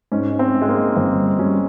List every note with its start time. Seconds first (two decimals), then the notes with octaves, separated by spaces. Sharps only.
0.12 G#2 C#4
0.33 G#2
0.39 C4
0.53 G#2
0.62 G#3
0.69 A#3
0.75 G#3
0.96 G1 C4
1.17 G2
1.39 G3 C#4